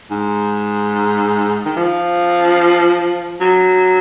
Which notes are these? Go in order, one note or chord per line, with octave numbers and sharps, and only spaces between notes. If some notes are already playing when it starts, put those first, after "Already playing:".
G#2
D#3
F3
F#3